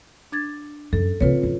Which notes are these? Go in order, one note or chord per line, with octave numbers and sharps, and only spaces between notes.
D4 G#6 A6
F#2 A4
C#3 C4 F4 B4 C#5
F#2